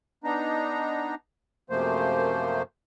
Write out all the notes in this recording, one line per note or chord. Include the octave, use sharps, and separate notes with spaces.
B3 D4 D#4 A#5
F#2 C3 F3 A3 A#3 C5